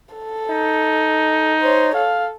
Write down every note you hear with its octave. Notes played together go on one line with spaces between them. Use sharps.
A4
D#4
C5 C#5
A4 F5